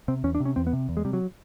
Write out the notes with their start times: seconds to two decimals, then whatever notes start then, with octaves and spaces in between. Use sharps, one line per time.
0.08 C3 C4
0.24 E2 C#4
0.35 D4
0.40 C3
0.45 C#4
0.56 E2 C4
0.67 B3
0.73 C3
0.89 E2
0.97 G#3
1.05 C3 G3
1.13 F#3